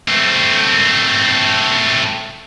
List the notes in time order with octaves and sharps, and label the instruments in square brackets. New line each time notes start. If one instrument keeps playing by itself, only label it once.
[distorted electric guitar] A3 C4